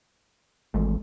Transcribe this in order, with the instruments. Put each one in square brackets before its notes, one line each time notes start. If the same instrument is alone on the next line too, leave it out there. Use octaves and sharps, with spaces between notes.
[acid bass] G#1 [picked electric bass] E3 G#3 A3